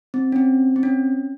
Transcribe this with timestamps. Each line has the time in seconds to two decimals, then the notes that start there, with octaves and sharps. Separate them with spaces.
0.14 C4
0.32 C#4
0.36 C4
0.76 C4
0.83 C#4